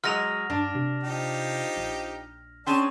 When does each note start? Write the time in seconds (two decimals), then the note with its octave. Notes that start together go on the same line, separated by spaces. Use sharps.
0.04 F#3 G#3 D#5 F6 A#6 F7
0.50 G2 D4
0.75 C3
1.03 F3 D#4 G4
1.77 A#1
2.66 C4 C#4 G#4 D5 A5